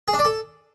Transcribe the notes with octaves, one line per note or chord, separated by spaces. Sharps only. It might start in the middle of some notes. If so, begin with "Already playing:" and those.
G#4
D4
D5
A4